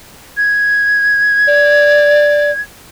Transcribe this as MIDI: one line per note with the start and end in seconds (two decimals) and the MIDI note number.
0.37 2.61 92
1.47 2.51 74